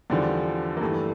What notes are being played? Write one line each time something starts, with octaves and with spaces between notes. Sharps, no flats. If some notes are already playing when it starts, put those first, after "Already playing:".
E2 D3 F3 G3
A#3
G2 E3 A3